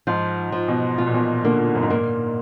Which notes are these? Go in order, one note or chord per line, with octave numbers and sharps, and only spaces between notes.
G#2 F3
F3
B2
B2 F4
A#2
B2
D3 A#3
F#2
G#2
A#2 A#3